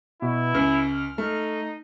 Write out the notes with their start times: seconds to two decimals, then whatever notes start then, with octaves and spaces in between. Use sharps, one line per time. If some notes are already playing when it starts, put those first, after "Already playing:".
0.22 B2 E4
0.54 C#2 F6
1.18 A3 D#4